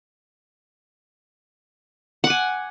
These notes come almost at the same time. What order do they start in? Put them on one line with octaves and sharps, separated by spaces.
F#5 D6 G#5